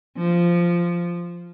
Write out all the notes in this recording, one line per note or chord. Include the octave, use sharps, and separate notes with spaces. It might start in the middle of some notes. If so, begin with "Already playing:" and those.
F3